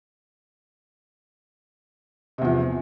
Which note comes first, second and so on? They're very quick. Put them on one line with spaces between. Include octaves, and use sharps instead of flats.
C3 E2 F3